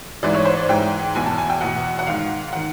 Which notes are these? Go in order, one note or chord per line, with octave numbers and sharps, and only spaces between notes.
G#2 E3 D5
C#5
C5
D5
G#2 E3 G5
E2 B2 G#5
A5
G#5
G5
E2 B2 F#5
F#5
G#2 D#3 F5
D#3 F#5